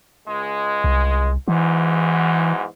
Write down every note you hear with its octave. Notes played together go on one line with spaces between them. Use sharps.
C#2 G#3
C2
E2 G#2 E3 F#3